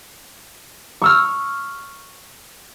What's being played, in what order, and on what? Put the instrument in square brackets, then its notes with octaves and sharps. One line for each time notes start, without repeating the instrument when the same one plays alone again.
[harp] C#6 E6 F6